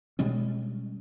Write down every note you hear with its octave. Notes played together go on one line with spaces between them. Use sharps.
B2 G3 G#3 C#4